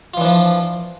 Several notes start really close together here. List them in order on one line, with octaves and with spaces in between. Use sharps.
F4 E3 D4 F3